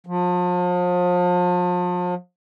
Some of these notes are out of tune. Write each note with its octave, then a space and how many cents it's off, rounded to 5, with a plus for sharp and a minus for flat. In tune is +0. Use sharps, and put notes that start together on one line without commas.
F3 +35